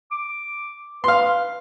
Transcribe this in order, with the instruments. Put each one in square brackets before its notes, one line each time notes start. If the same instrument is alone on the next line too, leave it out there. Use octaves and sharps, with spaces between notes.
[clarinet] D6
[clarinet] B4 [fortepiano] F5 C6